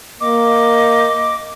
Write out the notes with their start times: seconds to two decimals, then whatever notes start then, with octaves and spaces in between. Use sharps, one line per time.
0.21 A#3 D#5 D6